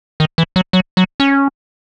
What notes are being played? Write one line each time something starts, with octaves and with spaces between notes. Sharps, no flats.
D#3
E3
F#3
F#3
F#3
C#4